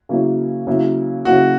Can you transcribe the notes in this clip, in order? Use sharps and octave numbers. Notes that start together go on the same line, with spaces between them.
C#3 F#3 A#3 E4
C#3 F#3 A#3 E4
C#3 F#3 A#3 E4 F#4